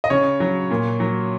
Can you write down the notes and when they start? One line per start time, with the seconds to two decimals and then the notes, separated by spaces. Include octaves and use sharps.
0.04 D#5
0.10 C#3 C#5
0.40 F#3
0.71 A#2
1.00 F#3